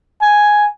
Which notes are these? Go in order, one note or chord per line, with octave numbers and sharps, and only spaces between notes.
G#5